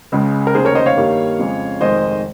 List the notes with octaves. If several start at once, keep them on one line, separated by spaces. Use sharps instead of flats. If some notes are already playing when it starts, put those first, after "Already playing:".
C#2 C#3 G#3
A#4
F1 D#2 C#3 G#4 C5
A#4 C#5
C5 D#5
C#5 F5
G2 D#3 G3 A#3
F2 C#3 F3 G#3
F1 F2 D#3 G#3 C5 D#5